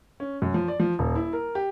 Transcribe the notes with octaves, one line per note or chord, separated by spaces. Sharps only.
C#4
F#2
F3
D5
F3
D#1
E4
A#4
G4